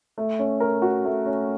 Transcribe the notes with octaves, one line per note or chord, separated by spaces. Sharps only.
A3
C#4
A#4
F#4
A3
C#4